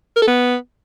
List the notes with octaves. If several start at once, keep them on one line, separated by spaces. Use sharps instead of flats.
A#4
A4
B3